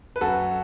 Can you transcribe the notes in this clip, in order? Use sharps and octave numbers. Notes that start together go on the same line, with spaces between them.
B4
F#2 F#4 A4